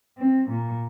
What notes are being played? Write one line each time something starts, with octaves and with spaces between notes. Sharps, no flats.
C4
A#2